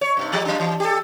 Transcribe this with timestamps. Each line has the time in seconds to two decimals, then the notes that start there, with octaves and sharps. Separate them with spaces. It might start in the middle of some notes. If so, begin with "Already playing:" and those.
0.01 C#5
0.17 G2 C3 D#4
0.33 F3 G#3 G4
0.45 F#3 D4
0.60 E3
0.80 G4 A4